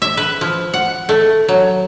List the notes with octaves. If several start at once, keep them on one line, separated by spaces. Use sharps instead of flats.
E5
B4
F3
F#5
A3
F#3